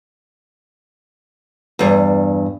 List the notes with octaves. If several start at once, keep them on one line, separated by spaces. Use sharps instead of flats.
E2 G2